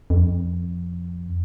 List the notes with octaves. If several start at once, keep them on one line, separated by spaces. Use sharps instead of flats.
F2